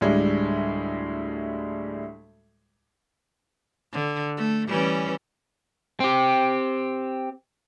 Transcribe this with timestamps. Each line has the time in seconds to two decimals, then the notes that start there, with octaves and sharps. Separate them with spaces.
0.01 D2 A2 G3 G#3
3.93 D3
4.38 A3
4.67 E3 G3 C#4
6.00 C4 G4